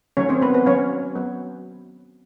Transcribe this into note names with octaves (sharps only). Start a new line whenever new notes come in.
D#3 F#3 A3 C#4 C#5
C4 C5
B3 B4
B3 B4
F#3 B3 C#4 C#5
F#3 B3